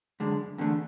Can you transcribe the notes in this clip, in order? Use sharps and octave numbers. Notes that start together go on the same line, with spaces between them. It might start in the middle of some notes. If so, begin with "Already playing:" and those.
F#2 D3 G#3
E2 D3 A3 D4